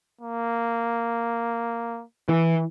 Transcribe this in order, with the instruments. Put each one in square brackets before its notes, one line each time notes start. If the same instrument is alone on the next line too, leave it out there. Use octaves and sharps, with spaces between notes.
[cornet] A#3
[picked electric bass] E3